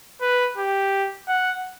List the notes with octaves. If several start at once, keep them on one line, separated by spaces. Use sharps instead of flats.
B4
G4
F#5